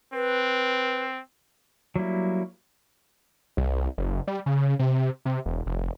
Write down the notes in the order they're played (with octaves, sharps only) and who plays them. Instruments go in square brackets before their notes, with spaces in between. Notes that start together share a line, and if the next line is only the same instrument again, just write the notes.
[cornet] C4 [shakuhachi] B4
[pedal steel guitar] F#3 G3 A#3 E4
[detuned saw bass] C2
F#1
G3
C#3
C3
C3
E1
F1